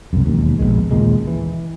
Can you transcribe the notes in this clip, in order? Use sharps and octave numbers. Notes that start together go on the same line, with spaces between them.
C2 F#2
E1 D#2
A#1 E2 B2 G#3
D#2 A#2 C#3 G#3
E3